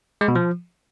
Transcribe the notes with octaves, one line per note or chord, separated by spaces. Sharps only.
G#3
B2
F3